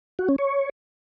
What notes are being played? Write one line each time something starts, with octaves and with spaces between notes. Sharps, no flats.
F#4
C#4
C#5